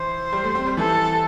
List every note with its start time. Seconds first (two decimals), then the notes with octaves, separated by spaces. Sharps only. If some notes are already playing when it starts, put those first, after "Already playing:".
Already playing: E3 C5
0.33 G3
0.44 A3
0.55 C4
0.66 G3
0.77 E3 A4